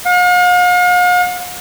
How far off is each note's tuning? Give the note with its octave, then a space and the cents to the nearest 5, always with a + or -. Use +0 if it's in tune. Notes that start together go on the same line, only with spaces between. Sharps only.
F5 +45